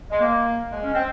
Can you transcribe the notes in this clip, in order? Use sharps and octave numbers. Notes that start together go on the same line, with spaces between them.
G#3
A#3
G#3
C#4
C4